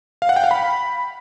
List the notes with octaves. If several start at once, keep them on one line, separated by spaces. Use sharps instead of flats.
F5
F#5
G5
F5
B5